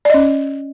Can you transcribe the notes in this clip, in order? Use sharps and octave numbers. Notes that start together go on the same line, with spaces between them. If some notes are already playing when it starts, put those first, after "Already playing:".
C#4 D5 D#5